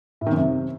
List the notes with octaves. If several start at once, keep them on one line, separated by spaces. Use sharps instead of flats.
A2
D#3
F#2
C3